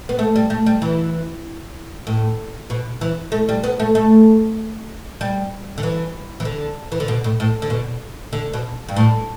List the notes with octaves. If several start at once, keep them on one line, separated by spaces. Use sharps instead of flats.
B3
A3
G3
A3
G3
E3
A2
B2
E3
A3
G3
B3
A3
A3
G3
D3
E3
E3
D3
E3
D3
B2
A2
A2
D3
B2
D3
B2
G2
A2